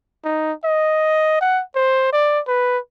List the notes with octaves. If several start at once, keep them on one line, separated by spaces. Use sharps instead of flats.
D#4
D#5
F#5
C5
D5
B4